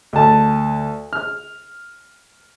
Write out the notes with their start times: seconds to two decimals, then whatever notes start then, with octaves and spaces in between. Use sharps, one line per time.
0.13 D2 A5
1.13 F6